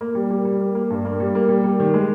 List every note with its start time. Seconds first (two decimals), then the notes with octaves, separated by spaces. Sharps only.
0.01 A#3
0.15 G3
0.30 G3
0.45 G3
0.60 A#3
0.75 A#3
0.90 G2
1.05 A#3
1.20 G3
1.35 A#3
1.49 G3
1.64 G3
1.80 D#3
1.94 G#3